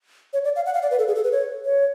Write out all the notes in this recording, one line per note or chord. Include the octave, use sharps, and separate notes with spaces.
C#5
D5
F5
F#5
F5
D5
B4
A4
G#4
A4
B4
C#5
C#5